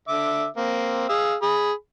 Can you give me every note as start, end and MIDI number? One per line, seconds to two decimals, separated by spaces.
0.08 0.46 50
0.08 0.46 76
0.08 0.46 86
0.57 1.05 58
0.57 1.05 60
1.09 1.35 68
1.09 1.35 77
1.09 1.35 88
1.42 1.72 68
1.42 1.72 83